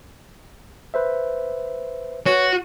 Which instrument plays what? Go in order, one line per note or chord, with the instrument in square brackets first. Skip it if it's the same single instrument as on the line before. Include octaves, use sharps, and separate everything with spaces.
[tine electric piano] B4 C5 E5
[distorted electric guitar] F#4 [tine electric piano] B4 [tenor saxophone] C#5